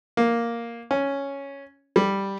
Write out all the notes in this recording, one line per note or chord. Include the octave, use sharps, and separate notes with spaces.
A#3
C#4
G3